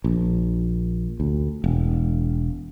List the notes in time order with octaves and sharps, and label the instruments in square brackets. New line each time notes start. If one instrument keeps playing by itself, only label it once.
[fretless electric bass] A#1
D2
E1